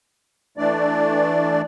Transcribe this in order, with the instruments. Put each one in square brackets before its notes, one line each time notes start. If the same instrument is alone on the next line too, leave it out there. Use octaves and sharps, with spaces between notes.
[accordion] E3 A3 D4 D5